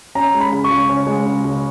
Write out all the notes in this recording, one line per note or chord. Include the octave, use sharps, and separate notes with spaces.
C#4 A#5
G#3
B5
C#3
C#6
C#2
C#4
G#3
C#3
C#2